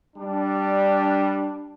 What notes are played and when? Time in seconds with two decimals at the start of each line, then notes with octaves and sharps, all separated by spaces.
0.16 G3 D4